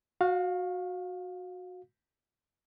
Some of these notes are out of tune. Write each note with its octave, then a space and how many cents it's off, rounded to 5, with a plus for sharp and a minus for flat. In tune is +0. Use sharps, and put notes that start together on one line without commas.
F#4 -15 F5 +20